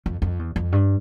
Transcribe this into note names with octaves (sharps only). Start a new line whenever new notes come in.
F2
F2
E2
F2
G2